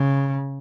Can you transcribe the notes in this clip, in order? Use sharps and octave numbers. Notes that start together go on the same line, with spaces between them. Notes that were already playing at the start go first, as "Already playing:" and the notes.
Already playing: C#3